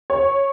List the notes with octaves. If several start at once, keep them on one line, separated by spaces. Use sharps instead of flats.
C#5